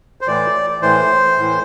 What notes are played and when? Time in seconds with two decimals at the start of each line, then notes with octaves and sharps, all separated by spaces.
0.21 C5
0.27 A2 E3 D5
0.82 A2 E3 C5
1.38 A2 E3